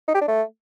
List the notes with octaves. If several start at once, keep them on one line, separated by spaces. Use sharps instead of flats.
D#4
G4
D4
A3